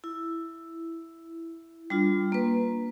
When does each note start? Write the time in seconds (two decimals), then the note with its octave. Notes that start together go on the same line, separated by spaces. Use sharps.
0.04 E4
1.90 G3 D4 F4
2.32 A#3 B4